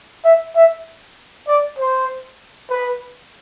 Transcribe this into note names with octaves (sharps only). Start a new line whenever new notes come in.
E5
E5
D5
C5
B4